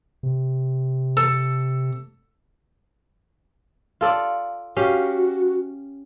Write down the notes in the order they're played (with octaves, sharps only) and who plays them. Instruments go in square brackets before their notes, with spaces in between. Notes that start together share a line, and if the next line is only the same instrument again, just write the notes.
[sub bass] C3
[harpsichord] A4
[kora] F4 A4 D5
[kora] C#4 G4 F5 [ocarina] F#4